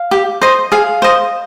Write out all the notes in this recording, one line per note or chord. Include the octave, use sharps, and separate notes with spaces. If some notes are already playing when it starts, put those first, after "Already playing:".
Already playing: F5
G4
C5 D#5
G#4 F5
C5 D#5